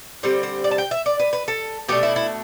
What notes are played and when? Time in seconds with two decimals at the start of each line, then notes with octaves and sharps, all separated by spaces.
0.23 D3 G3 C4 C5
0.43 C5
0.64 D5
0.71 A5
0.78 G5
0.91 E5
1.06 D5
1.20 B4
1.33 B4
1.48 A4
1.88 B2 A3 D4 G4
2.03 E4
2.16 E4